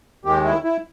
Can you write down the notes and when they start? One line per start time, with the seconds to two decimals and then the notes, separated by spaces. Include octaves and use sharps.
0.25 D#2 D#3 G#3 G4
0.44 E4
0.63 E4